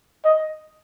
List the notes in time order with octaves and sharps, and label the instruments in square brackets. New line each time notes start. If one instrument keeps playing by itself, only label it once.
[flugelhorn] D#5